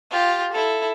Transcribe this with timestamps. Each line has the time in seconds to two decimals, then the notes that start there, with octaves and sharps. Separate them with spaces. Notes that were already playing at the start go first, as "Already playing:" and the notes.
0.11 F4 G4
0.52 E4 A4